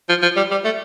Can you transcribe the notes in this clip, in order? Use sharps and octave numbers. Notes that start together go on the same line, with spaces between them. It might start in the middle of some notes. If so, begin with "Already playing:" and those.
F3
F3
G3
G3
A3